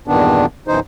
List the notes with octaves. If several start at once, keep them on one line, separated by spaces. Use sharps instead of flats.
E2 G2 A#2 D#3 B3 D4
F#2 B2 E3 D#4 C5